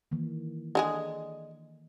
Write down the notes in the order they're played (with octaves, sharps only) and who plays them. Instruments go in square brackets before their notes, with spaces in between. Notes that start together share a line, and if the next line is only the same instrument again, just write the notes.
[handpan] D#3 E3 A#3
[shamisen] D3 G#3 G#4